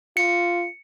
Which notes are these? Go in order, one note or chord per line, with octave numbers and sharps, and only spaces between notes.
F4 C#7